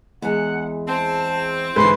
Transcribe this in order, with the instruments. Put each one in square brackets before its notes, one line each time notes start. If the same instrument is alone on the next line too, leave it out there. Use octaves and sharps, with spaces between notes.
[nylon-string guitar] E2 G#3 [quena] F#5
[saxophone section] C4 [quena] A5
[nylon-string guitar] G#2 D3 E3 [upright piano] B4 [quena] C6